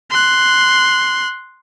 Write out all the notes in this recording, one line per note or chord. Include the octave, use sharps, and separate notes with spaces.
C6 F#6